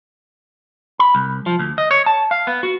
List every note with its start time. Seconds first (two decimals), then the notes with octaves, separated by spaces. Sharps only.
0.99 B5
1.15 C2
1.46 F3
1.59 D2
1.78 D#5
1.91 C#5
2.06 A5
2.31 F5
2.47 B3
2.63 F#4